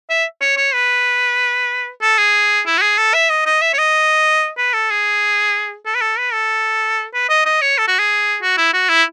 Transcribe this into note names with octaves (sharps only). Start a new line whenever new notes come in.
E5
C#5
C#5
B4
A4
G#4
E4
F#4
G#4
A4
E5
D#5
D#5
E5
C#5
D#5
B4
A4
G#4
A4
B4
A4
B4
A4
B4
D#5
D#5
C#5
A4
F#4
G#4
F#4
E4
F#4
E4